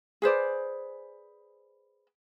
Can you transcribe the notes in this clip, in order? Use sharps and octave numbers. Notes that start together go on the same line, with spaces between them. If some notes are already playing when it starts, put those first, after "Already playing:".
G#4 B4 C5 D5